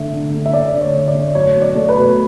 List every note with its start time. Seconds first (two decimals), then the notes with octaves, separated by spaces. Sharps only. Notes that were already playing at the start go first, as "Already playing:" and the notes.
Already playing: D3 A3 E5
0.13 D3
0.33 A3
0.46 E5
0.53 A3 D5
0.74 D3
0.81 C#5
0.94 D3
1.08 D5
1.15 A3
1.35 F#3 C#5
1.55 B2
1.62 D5
1.75 A3
1.89 B4
1.96 B2